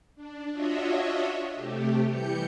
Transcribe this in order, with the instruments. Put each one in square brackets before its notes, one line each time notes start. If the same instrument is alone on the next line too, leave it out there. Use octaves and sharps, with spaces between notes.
[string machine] D4
D4 F4 F#4 C#5 D#5 E5
C3 A3 G4
E3 G3 G6 C#7